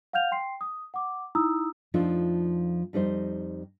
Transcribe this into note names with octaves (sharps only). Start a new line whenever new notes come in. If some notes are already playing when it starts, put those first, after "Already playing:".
F5 F#5 F6 G6 F7
G5 C6 C7
D#6
F#5 D6
D#4 E4 A#5 D#6 E6
F2 F3 A3 D4 D#4 F4
F2 G3 D#4 C5